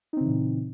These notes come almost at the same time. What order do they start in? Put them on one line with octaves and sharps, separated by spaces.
D#4 C4 C#3 E3 A#2